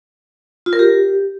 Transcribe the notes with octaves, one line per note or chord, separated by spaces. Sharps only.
F4
A#4
G4